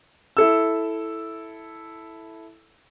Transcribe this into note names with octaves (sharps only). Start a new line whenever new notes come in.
E4 A4 E6